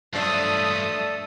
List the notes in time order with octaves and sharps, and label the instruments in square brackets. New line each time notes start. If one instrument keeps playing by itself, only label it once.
[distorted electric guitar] G2 F#3 [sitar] F3 D4 [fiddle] A3 D#6 [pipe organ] A4